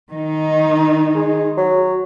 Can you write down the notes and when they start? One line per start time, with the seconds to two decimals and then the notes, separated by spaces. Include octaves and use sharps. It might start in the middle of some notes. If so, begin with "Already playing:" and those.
0.13 D#3 D#4
1.15 G#3
1.57 F#3